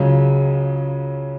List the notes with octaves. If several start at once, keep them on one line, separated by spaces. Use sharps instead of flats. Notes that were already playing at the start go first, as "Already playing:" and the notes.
Already playing: C#2 C#3 F#3 C#4